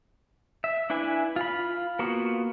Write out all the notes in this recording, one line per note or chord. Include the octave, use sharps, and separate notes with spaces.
E5
D4 E4 B4 G#5
F4 B5
A#3 B3 F4 F#4